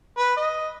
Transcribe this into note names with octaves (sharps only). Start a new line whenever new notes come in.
B4
D#5